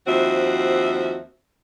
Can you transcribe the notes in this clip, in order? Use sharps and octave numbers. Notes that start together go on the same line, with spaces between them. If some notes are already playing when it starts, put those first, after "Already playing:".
D#2 F3 C4 F#4 E5